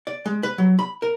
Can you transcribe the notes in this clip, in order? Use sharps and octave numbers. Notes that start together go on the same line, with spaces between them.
D5
G#3
B4
F#3
B5
A#4